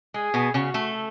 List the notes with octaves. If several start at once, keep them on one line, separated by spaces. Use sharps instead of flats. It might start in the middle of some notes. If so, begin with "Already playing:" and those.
G#3 G#4
B2 B3
C#3 C#4 F#4
A3 A4